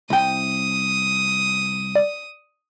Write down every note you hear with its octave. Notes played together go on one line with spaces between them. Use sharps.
C2 G5 D#6
D5